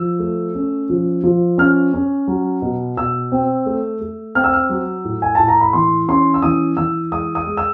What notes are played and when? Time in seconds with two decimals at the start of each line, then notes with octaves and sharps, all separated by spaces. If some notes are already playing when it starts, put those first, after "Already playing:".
Already playing: F3 E6
0.20 A3
0.55 C#4
0.90 F3
1.24 F3
1.58 C#4 F6
1.93 C#4
2.28 F#3
2.62 B2
2.97 B2 E6
3.32 C4
3.66 A3
4.01 A3
4.35 C4 F6
4.44 E6
4.53 F6
4.70 F#3
5.04 A2
5.22 G#5
5.35 A2 A5
5.48 A#5
5.61 B5
5.73 E3 C6
6.08 C#4 C6
6.34 E6
6.42 E3 D#6
6.77 E3 E6
7.12 G#3 D#6
7.35 D#6
7.47 G#3
7.57 E6